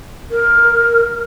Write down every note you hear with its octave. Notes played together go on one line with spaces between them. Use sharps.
A#4